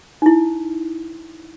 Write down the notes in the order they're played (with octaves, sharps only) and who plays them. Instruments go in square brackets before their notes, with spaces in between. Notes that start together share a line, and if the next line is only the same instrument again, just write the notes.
[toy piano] D#4 E4